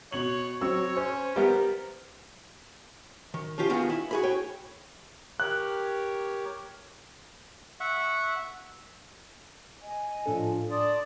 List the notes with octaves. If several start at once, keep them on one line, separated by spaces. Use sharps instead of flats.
B2 C#5 F#7
F#3 C4 C#5 E6
C#4 C5
G3 B3 A#4
D#3
F3 C#4 F4 G4
D#3 G#3 B3 F4 F#4
E4
F#4 G#4 B5
C#5 G5
G4 A#4 C#5 F#6
E5 F#5 C#6
D#5 G#5
A2 F3 D4 A4
D5 A5 C6 D#6